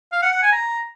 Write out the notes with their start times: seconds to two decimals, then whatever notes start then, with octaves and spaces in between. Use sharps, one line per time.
0.13 F5
0.23 F#5
0.33 F#5
0.43 G#5
0.53 A#5